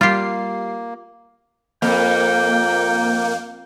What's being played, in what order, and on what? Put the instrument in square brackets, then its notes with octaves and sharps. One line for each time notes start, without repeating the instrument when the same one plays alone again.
[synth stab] G3 C7 [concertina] A#3 [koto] F4 G4
[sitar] F2 [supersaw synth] A#3 [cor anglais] G5